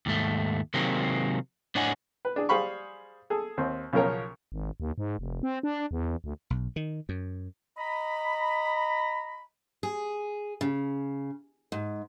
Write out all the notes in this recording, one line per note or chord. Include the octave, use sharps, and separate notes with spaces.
D#2 G#2 A3
C3 D#3 F#3 G#3 A#3 C4
A2 D4 C#5 D#5 F#5 G#5
B4
D4 G#4
G3 G#4 C5 F5 B5 C#6
G#4 A4
D#2 C4
B1 C#3 F3 A#4 C#5
G#1
D#2
G#2
F1
C4
D4
E2
D2
B1
D#3
F#2
D#5 A#5 B5
G#4
C#3
G#2